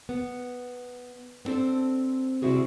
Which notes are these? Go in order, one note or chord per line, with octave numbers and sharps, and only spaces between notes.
B3
B3 C4 D4 A4 C5
C3 G3 C4 E4 F#4 G#4